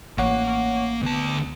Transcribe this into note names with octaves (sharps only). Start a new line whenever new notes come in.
A1 A#3 C#5 F#5 C#6
D2 B3 A5